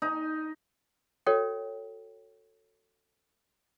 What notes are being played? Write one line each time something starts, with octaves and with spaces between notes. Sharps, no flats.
D#4
F#4 A4 C#5 D#5 G5